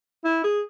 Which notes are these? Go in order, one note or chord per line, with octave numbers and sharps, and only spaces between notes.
E4
G#4